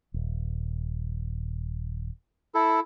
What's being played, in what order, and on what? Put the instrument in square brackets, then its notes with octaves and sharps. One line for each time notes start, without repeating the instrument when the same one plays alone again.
[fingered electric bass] D#1
[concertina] E4 A4